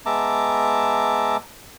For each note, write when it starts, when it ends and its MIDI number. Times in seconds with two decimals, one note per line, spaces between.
0.06 1.37 56
0.06 1.37 59
0.06 1.37 76
0.06 1.37 81
0.06 1.37 82
0.06 1.37 86